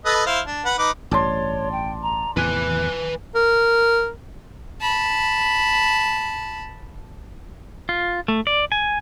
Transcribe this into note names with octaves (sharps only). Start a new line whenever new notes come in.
A4 B4 D#5
E4 C5 F5
D4
B4 F#5
D#4 B4 D6
A1 G2 C#5 D5 A5 C6
G5
A#5
E2 A2 C3 B4 G#5 F#6
A#4
A5 B5
F4
A3
D5
G#5